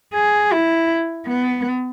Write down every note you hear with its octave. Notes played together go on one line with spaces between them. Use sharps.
G#4
E4
B3